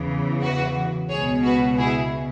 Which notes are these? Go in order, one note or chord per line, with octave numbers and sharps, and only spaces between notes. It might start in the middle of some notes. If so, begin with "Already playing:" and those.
Already playing: E2 C#3 E3
F#4 B4
C#2 G#4 C#5
B2
F#4 B4
E4 G#4